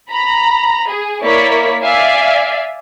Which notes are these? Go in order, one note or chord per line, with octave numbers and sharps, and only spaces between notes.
A#5 B5
G#4
A#3 E4 C#5 D5 B6
D5 E5 F5 G#5